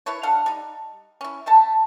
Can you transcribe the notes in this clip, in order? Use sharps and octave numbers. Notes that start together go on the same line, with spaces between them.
E4 A4 B4 C#5
D4 A4 F5 F#5
G3 D#4
C#4 E4
A3 A4 A5